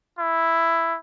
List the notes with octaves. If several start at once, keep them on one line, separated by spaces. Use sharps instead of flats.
E4